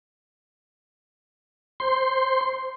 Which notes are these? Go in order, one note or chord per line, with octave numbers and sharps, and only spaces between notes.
C5 C6